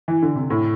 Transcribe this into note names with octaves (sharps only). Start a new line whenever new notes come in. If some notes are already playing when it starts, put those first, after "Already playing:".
E3
D3
C3
A2